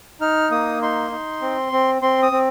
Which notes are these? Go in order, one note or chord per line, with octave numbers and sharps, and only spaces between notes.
D#4 F6
A#3 D#6
D#4 C6
D#4
C4
C4
C4 C6
D#6
C4